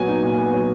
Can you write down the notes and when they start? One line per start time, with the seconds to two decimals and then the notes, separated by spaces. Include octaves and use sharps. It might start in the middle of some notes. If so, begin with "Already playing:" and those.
Already playing: A#2 F#3 B3 G#5
0.08 D#4
0.23 A#2
0.38 B3
0.54 F#3